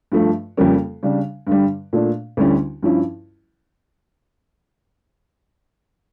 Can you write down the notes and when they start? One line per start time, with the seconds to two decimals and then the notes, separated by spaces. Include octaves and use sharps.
0.12 G2 F3 A3
0.57 F2 C#3 G3 A#3 C#4
1.03 C#3 G3 D4
1.47 G2 D3 G3
1.93 A#2 A3 D4
2.37 D2 D3 G3 C#4 E4
2.83 G2 F3 C#4 E4